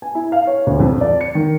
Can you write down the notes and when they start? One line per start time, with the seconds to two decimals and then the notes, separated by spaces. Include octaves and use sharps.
0.02 G#5
0.15 E4
0.32 F5
0.47 C#5
0.67 D2
0.80 F2
1.01 D5
1.21 C#7
1.35 D#3